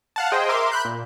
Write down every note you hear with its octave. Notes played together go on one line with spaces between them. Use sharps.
F5 F#5 A5
G#4 C5 D#5 G5
A#4 E5 C6 D6
B5 F#6 G6
A#2